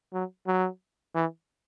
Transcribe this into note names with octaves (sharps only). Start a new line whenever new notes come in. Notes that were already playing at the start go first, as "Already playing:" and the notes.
F#3
F#3
E3